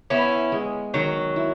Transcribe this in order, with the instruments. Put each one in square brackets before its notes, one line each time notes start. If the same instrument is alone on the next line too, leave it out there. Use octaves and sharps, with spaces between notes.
[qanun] B3 [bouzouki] C#4 E4
[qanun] G#3
[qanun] D#3 [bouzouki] F#3
[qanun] E4